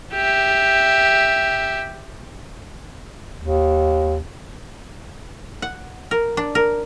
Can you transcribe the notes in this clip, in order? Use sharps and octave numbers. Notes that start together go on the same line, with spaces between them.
G4 E5
D#2
F#5
A#4
D4
A#4